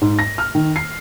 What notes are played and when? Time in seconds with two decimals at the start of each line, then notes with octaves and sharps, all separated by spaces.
0.01 G#2
0.19 A#6
0.38 F6
0.55 D#3
0.76 C7